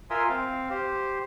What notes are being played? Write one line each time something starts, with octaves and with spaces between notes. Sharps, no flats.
F4 A#4 E5 G#5 C6 D#6
C4 F5
G4 C5